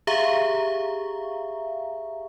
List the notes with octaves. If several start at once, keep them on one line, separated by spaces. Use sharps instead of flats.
G4 G#4 E5 F5 A#5 C#6